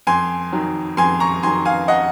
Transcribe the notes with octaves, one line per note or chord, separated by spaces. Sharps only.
F2 G#5 C6
D#3 F#3
F2 G#5 C6
A#5 C#6
D#3 F#3 G#5 C6
F5 G#5
D#5 F#5